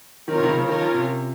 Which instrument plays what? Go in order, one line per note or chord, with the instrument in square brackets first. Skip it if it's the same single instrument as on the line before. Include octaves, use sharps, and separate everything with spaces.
[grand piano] D#3 [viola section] C4 F4 A#4 C#5
[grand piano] C3
D#3
C#3
C#3
[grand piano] D#3 [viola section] C#4 F4 A#4 C#5
[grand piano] F3
C3